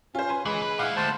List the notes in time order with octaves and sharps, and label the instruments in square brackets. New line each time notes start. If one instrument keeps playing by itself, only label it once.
[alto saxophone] C#4 [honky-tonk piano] F4 C5
[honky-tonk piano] B4 G#5 C6
[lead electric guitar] E3 [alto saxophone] G#3 [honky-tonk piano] B5 C7 F#7
[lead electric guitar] B4
[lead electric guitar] A#2 E4 [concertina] F5 [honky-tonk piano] F#5
[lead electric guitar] D2 [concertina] C5 A5